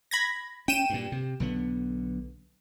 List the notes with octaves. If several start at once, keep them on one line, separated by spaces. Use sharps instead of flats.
B5 G#6 A#6
C#4 G5 D#7 E7
G2 A#2
C3
B1 D3 B3